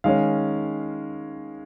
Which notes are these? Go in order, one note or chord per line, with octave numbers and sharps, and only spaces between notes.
D#3 G#3 C#4 F5